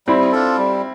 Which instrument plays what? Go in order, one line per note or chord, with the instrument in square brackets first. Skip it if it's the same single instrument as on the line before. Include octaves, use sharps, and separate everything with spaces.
[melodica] G3 [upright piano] C4 E4
[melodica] D4 F4 A4
G3